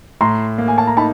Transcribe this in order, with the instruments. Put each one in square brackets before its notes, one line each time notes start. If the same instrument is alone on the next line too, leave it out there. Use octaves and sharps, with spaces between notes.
[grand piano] A2 [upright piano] A#5 C6
[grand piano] A#3
[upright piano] G#5
A5
A#5
[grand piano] D#4 [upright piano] A5 B5